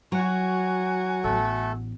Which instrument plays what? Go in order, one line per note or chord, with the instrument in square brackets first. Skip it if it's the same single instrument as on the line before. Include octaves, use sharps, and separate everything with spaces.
[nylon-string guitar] F#3 [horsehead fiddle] F#4 G#5
[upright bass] A1 B3 [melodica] A3 A4